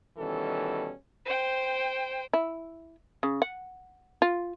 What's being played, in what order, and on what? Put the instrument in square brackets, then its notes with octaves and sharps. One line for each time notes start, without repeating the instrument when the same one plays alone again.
[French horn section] B2 D#3 E3 G3 C#4 A4
[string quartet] C5 G5
[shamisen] E4
C#3
F#5
F4